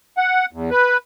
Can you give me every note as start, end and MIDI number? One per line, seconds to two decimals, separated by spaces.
0.18 0.46 78
0.53 0.70 40
0.71 0.97 71